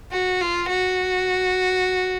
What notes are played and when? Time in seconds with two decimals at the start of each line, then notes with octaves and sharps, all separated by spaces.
0.12 F#4
0.40 F4
0.69 F#4